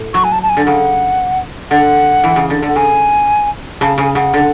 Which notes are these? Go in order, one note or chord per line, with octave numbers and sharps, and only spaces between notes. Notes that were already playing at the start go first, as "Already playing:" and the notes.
Already playing: A2
F#3 C#6
G#5
A5
A5
G#5
D3
C#3 F#5
D3 F#5
E3
C#3
D3
D3
F#5
C#3 G#5
C#3 A5
C#3 G#5
C#3 F#5
D3